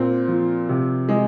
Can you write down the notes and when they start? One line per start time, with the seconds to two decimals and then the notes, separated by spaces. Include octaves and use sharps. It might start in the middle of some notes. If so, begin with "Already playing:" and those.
Already playing: A#2 C4
0.28 F3
0.69 C3
1.09 G#3